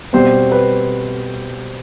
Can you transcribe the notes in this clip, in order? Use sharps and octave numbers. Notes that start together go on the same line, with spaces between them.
B2 G3 C4 C5
B4